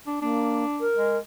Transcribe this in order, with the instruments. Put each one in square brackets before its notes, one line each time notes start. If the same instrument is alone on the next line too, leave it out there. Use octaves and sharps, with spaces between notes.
[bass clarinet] D4
[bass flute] A#3 [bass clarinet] D4
[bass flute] A#4
[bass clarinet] G#3